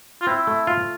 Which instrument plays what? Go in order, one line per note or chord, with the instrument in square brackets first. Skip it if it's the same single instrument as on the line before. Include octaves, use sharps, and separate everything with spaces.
[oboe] F4
[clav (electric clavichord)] C4 [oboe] E4
[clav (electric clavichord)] A3
F4